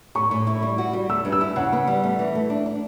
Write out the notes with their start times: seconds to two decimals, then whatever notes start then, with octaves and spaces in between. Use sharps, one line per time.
0.15 A2 C#6
0.31 A2
0.47 E4
0.62 G3
0.78 F#4
0.93 G3
1.09 A3 E6
1.25 G2
1.32 E6
1.41 E4
1.56 C#3 F#5
1.73 B3
1.87 G3
2.04 A3
2.19 E3
2.35 A3
2.50 D4
2.66 D4